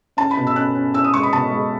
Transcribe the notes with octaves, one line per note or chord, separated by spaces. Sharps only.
C#4 A5
B5
B2
E6
C#4 F#6
C#4
C#4 E6
D#6
G#3 C#6
B5
B2 A5
G#3